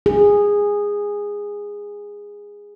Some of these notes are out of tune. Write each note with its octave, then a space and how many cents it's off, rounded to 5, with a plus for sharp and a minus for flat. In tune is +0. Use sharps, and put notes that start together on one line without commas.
G#4 -15